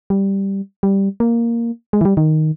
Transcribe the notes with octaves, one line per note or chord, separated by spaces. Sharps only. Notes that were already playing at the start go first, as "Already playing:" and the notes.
G3
G3
A#3
G#3
E3
G3
D#3